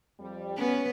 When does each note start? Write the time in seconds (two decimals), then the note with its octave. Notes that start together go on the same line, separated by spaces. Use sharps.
0.19 F2 G3
0.57 B3 C#4 B4